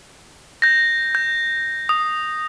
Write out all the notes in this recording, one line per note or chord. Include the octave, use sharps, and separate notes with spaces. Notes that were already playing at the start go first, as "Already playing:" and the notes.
G6 A#6
G6
D#6